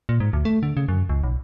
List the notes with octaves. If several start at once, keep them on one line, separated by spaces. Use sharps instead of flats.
A#2
G#2
D2
A3
D3
C#3
F#2
C#2
B1